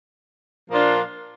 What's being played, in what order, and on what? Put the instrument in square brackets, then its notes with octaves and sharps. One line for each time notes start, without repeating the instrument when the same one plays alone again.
[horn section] A#2 F3 A#3 D4 F4